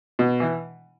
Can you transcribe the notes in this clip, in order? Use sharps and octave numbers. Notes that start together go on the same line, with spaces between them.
B2
E3